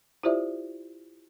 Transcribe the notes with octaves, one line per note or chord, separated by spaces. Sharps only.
E4 F4 G4 C5 D5 E5